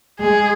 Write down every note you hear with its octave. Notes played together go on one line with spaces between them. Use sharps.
G#3 G#4